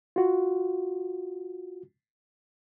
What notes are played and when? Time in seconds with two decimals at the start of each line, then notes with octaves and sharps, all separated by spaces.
0.16 F4 F#4